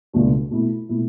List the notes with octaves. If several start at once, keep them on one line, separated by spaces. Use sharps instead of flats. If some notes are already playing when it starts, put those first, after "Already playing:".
C#2 B2 A3 D4 F#4
B2 A3 E4
B2 A3 E4